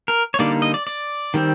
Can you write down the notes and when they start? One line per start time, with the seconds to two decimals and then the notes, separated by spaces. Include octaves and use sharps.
0.08 A#4
0.34 C#5
0.39 D3 G3 A#3 D#4 D5
0.62 D#5
0.74 D5
0.87 D5
1.34 D#3 G3 C4